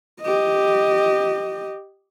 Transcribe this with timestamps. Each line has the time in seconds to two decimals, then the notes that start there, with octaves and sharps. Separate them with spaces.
0.22 G4 D#5